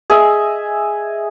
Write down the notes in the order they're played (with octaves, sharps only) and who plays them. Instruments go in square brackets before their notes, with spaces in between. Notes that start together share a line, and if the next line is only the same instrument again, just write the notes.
[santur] G#4 D#5 E5